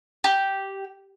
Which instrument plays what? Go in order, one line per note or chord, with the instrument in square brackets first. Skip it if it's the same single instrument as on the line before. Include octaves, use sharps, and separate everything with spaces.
[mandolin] G4